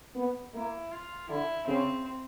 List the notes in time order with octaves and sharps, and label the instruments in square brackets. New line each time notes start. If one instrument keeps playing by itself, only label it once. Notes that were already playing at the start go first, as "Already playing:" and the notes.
[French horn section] B3
[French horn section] A#3 [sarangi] E4
[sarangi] F4
[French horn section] D3 [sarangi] E4
[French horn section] C#3 [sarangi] C4